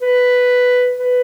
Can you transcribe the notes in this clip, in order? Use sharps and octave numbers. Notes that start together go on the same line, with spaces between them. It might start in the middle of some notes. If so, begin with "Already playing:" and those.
B4
B4